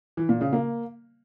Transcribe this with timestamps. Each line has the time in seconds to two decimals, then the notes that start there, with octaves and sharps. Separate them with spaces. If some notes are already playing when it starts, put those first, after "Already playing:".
0.17 E3
0.29 A#2
0.41 C#3
0.53 A#3